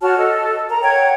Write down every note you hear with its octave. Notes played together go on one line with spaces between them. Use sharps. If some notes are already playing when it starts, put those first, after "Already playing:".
F#4 C#5 A5 F6
A4 D#5
A#4 A#5
C#5 F#5 G5 G#6